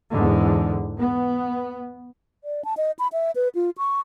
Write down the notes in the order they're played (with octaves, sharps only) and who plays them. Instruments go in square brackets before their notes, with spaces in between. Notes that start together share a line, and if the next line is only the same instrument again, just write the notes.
[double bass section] E2 G#2 D3
B3
[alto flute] D5
A5
D#5
B5
E5
B4
F4
C#6